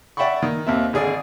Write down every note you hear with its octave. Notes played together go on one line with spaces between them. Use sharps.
D5 E5 F#5 G5 B5 C#6
D#3
D#2 C4 E5
G#1 D3 G#4 D5